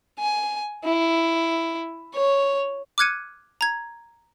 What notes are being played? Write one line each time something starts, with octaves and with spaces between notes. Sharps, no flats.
G#5
E4
C#5
D6 F6 F#6 G#6 C#7 D#7
A#5 G#6